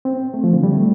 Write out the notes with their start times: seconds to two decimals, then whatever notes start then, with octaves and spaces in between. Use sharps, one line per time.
0.05 C4
0.34 A3
0.44 F3
0.53 D3
0.63 G3
0.73 A3